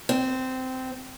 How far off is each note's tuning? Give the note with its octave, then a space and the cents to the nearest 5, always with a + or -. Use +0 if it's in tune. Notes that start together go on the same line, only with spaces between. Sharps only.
C4 -15